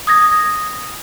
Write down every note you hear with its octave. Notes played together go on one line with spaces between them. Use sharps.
D#6 G#6 A#6